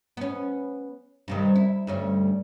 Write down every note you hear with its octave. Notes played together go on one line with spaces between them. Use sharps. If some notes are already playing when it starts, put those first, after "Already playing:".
B3 C#4
G2 C3 D#3
E4
D2 G2 C#4